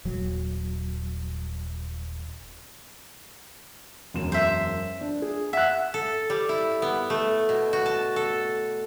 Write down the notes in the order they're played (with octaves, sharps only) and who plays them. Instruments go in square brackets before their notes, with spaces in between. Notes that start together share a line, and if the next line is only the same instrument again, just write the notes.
[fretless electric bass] D#1 F#3
[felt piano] E1 F#2 E7
[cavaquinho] C5 E5
[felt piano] D4
G#4
[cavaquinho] E5 [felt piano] F#5 F#6
[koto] A4
G3
E4
B3
A3
B2
F#4
A5
A4